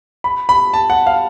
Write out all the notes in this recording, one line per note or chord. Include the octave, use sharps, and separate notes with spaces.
B5
B5
A5
F#5
F5